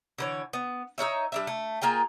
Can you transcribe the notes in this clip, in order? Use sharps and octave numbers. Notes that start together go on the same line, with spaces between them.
D3 E3 C#5
B3
D#4 F#4 C#5 E5
G3 D4 E5
A3
A#3 F4 G#4 G5